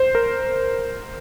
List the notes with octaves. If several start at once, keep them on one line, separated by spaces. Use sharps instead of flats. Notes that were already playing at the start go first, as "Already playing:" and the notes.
Already playing: C5
A#4